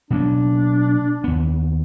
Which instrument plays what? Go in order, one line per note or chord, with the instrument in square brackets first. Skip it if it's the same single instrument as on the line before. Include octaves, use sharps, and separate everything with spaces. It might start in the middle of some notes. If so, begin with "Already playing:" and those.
[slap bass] B2 F#3 A#3 [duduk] D4
[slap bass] D#2 B3